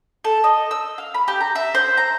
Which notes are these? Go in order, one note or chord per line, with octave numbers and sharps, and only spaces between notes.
A4
D#5
E6
F5
B5
G4
A#5
E5
C5
A#5